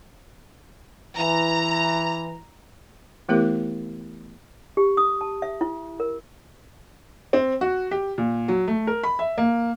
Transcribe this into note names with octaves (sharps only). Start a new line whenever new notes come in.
E3 A#5
E3 A3 B3 E4 G4 A#4
G4
D#6
A5
E5
E4
A#4
C4
F#4
G4
A#2
F#3
A3
A#4
B5
E5
A#3